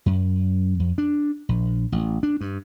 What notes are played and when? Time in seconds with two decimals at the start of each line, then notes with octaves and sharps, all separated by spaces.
0.06 F#2
0.80 F2
0.98 D4
1.49 A#1
1.92 A1
2.23 D4
2.41 G2